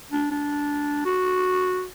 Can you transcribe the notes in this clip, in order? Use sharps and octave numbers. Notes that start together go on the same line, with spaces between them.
D4
D4
F#4